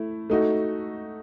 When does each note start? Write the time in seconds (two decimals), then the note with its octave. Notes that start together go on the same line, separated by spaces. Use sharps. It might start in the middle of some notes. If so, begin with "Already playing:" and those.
Already playing: A3 E4
0.30 A3 D#4 F#4 A4